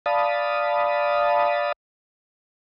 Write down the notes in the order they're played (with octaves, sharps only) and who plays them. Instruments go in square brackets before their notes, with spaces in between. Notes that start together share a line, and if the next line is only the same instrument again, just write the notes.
[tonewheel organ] D5 F5 A5 B5 D#6